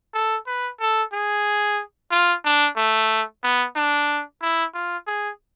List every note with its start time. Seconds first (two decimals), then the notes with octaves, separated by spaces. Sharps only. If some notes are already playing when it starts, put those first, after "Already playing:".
0.14 A4
0.47 B4
0.80 A4
1.13 G#4
2.11 F4
2.45 D4
2.77 A3
3.43 B3
3.76 D4
4.42 E4
4.74 F4
5.07 G#4